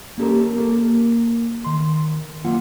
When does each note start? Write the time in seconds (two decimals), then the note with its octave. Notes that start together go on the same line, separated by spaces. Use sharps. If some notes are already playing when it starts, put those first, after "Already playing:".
0.18 A#3 C#4 G4 A4 A#4
0.56 A#3 A4
1.65 D#3 C6
2.45 F#2 A#3 F4 F#5